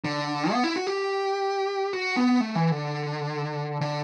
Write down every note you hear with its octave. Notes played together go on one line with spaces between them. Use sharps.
D3
B3
E4
F#4
G4
F#4
B3
A3
E3
D3
D3